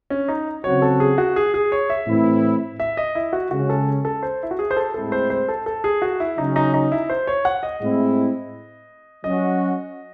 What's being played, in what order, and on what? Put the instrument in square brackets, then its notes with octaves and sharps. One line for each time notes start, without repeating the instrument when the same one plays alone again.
[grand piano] C#4
D#4
[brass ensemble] C#3 F#3 C4 F#4 [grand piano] C#5
[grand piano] A4
G#4
F#4
G#4
G#4
C#5
E5
[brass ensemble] A2 E3 C4 E4
[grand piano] E5
D#5
E4
F#4
[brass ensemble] C#3 G#3 C#4 [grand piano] F#4
[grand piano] A4
A4
C5
E4
F#4
G#4
C5
A4
[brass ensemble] A2 G#3 C4 E4 [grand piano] A4
[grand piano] C5
C5
A4
A4
G#4
F#4
E4
[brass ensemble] C#3 F#3 C#4 [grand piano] D#4
[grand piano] D#4
D#4
E4
C5
C#5
F#5
D#5
[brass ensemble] A2 G#3 C4 E4
[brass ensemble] F#3 C#4 F#4 [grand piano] D#5